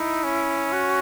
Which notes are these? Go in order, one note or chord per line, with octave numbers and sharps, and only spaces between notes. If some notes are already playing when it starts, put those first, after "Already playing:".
Already playing: D#4 E4
C#4
F#4